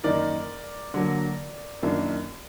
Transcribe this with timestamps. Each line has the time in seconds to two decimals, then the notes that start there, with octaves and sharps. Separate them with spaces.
0.04 F#2 D#3 A#3 D#4 A#4 D5
0.94 D3 F#3 A#3
1.82 F#2 D#3 A#3 D4 F4